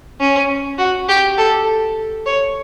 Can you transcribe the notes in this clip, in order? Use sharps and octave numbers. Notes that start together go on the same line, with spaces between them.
C#4
F#4
G4
A4
C#5